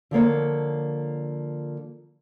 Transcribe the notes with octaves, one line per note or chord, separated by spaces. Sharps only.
D3 F3 A#3 C#5